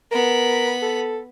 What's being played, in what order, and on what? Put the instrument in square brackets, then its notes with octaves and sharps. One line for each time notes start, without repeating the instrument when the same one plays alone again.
[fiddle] B3 B5 [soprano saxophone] A#4
[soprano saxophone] A4